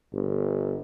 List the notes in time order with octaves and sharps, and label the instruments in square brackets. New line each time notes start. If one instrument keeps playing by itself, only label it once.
[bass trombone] G1